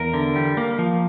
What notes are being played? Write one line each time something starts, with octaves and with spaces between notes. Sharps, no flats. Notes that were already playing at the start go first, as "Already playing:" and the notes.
Already playing: E2 A#4
D3
G3
A#3
F3